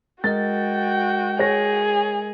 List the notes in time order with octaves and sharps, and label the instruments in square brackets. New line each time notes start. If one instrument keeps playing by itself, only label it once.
[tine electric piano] G#3 A#4 D#5 [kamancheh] F#4 G5 [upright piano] A6
[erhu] G#4 [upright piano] C#5 A#6